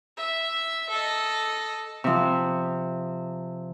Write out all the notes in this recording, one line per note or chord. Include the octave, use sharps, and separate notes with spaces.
E5
A4 D#5
C3 F3